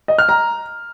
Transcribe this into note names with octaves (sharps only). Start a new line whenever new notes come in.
D#5
F6
A#5